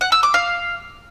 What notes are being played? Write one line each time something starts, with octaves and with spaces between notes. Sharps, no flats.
F#5
E6
D6
F5